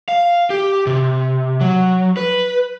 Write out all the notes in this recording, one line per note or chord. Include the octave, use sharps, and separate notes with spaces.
F5
G4
C3
F#3
B4